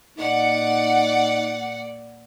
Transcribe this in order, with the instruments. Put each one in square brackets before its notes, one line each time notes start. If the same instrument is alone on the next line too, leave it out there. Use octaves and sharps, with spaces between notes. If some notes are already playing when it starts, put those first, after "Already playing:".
[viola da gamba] A#2 D5 [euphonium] D#4 [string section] F#5